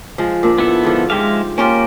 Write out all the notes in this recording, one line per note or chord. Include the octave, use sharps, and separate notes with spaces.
F3 G#3
A#2 D4
B3 E4 A4
G#2 D3 F3
G#2 F3 G#3 G4 E5 F5
A#3 C#4 F4 G4